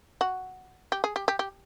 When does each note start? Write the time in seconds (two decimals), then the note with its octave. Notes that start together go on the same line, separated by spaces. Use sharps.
0.21 F#4
0.92 G4
1.04 G#4
1.16 G4
1.28 G4
1.39 G4